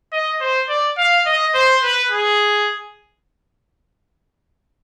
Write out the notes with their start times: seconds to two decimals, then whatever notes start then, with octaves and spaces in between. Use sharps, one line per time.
0.12 D#5
0.41 C5
0.69 D5
0.98 F5
1.26 D#5
1.54 C5
1.83 B4
2.11 G#4